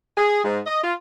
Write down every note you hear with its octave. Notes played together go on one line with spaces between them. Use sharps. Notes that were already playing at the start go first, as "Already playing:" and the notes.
G#4
G#2
D#5
F4